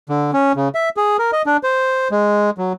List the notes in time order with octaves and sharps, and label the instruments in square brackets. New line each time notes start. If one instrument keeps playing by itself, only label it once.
[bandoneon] D3
C#4
C#3
E5
G#4
A#4
D#5
D4
C5
G#3
F#3